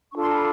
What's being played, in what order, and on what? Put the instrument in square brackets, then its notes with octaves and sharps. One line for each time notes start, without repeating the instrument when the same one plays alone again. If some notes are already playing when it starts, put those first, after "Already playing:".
[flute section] D4 F4 A4 C#6
C6
A#5
B5